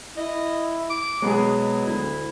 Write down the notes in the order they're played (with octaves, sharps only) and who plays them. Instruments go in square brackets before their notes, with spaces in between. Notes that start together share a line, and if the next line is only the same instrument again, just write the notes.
[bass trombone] E4 [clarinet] D#5
[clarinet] D6
[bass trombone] B2 [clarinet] F#3 [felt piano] G#3 B3 G#4
[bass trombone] D2 [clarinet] E4